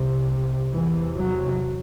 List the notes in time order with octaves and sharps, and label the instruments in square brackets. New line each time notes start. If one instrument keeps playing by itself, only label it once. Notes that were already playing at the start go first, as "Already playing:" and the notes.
Already playing: [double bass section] C2 C3
E2 C3 E3
F#3